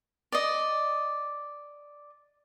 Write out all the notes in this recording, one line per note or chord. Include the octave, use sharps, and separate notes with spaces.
D5 D#5